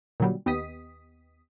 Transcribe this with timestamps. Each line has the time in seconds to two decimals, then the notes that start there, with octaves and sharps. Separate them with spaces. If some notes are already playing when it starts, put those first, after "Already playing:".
0.20 A#2 D3 F#3 G3
0.46 D#2 B3 G4 D#5 D#6 B6